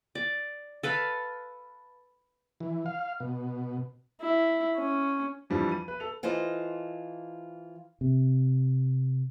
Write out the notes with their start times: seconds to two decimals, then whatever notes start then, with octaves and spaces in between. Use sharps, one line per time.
0.15 D5
0.83 A4 B4 F5
2.60 E3
2.86 F5
3.20 B2
4.21 E4
4.77 C#4
5.50 F2 E3 F3 G3 D4
5.72 D#7
5.88 B4
6.00 A4 F7
6.23 E3 F4 A4 C5 D#5
8.01 C3